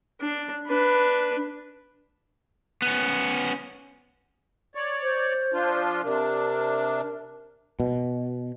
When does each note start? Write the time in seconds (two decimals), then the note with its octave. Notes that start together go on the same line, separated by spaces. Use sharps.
0.21 D4
0.68 D4 B4
2.82 B3 C#4
4.75 C#5 D5
5.02 C5
5.53 F3 D4 F4
6.04 C3 D4 A#4
7.80 B2